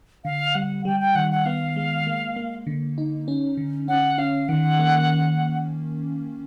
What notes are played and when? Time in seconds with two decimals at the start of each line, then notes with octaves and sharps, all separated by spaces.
0.24 D3 F5
0.55 G3 F#5
0.85 G3 G5
1.00 G5
1.15 D#3 F#5
1.31 F#5
1.46 B3 F5
1.76 G#3
2.07 A#3
2.36 A#3
2.67 D3
2.98 D#4
3.28 C#4
3.57 D3
3.88 C#4 F#5
4.18 C#4 F5
4.48 D#3 F#5
4.79 A#3